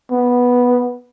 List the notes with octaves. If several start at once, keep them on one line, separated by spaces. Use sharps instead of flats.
B3